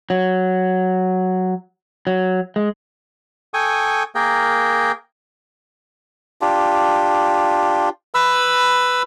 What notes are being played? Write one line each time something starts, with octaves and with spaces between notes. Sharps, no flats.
F#3
F#3
G#3
A4 G5 G#5 C#6 D#6
A#3 G#4 A#4 G5
D4 F4 G4
B4 B5 E6